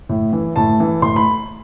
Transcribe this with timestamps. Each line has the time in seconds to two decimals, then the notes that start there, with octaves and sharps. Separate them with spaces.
0.09 A2
0.33 E3
0.56 A2 A5
0.80 E3
1.02 A2 C6
1.16 B5